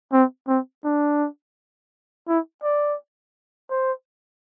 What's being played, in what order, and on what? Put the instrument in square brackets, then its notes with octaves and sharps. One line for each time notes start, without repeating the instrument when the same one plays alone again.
[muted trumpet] C4
C4
D4
E4
D5
C5